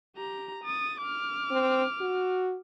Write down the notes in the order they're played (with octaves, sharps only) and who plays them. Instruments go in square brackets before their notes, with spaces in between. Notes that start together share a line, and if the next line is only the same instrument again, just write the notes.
[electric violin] G4 A#5
D#6 A6
D6 F6
[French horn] C4
F#4